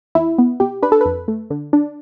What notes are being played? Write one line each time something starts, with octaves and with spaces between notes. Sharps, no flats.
E2 E4
B3
B2 G4
D4 B4
A4
F2 B4
A3
D3
D4